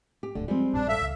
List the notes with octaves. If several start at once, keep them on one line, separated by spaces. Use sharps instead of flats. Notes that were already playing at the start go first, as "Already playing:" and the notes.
G4
D1 C2 D3 A3
F3 G3 G#3 C4
A#1 G2 D4
A4 E5 F5
C#2